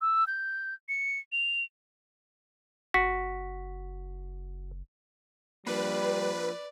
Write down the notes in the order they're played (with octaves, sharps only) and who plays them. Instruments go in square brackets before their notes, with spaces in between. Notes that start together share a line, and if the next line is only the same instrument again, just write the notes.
[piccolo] E6
G6
C#7
F7
[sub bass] F#1 [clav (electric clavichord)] F#4 [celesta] B6
[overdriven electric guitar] F3 A#3 [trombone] G3 [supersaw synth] B4 [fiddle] D5